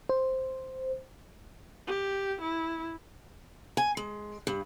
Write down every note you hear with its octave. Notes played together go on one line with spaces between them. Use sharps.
C5
G4
E4
G#5
G#3
G2